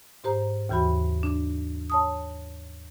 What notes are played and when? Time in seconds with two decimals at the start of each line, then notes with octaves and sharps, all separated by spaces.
0.24 G#2 G4 C5 A#5
0.69 D#2 C#3 E3 F#4 B5
1.23 D4
1.90 C#5 A5 D#6